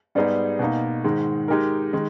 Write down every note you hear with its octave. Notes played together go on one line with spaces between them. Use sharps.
G#2 G3 B3 D#4 G#4
B2 A#3 D#4
G#2 D#3 G#3
G#3 D#4 G4 A#4
D#3 G#3